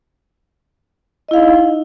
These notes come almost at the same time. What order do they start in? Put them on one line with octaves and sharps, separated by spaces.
D#5 E4 F5 D#4